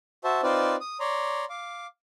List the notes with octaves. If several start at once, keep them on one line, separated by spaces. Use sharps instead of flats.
F#4 C5 E5 A5
C4 D#4 F4 B4 C5 D5
D#6
C#5 D5 A#5 C6
F5 D6